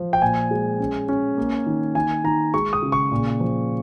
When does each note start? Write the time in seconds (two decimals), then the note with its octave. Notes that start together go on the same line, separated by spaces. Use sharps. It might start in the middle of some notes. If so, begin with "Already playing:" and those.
Already playing: F3
0.13 G5
0.22 A#2 G#5
0.51 G#3
0.80 C#4
1.09 C#4
1.37 A#3
1.66 D#3
1.95 D#3 G#5
2.24 D#3 A#5
2.54 G#3 C#6
2.73 D#6
2.83 C#3
2.92 C#6
3.12 A#2
3.41 F3